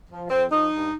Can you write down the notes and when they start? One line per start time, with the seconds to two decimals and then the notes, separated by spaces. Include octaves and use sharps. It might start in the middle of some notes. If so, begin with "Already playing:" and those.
0.10 F3
0.30 F2 C4
0.51 F3 D#4
0.72 G2